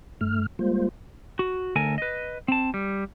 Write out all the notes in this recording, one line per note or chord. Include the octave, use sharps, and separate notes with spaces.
G2 A3 F6
G3 G#3 A#3 F4 C5
F#4
D2 A4 A#4 G#5
B4 D#5
C4 A5
G3